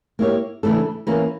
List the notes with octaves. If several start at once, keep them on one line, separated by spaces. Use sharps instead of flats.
A#3 E4 G4 C#5
C#3 E3 A3 D4 A4
E3 A#3 C#4